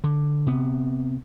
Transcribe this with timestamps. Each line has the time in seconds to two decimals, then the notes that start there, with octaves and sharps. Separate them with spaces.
0.04 D3
0.47 C3 B3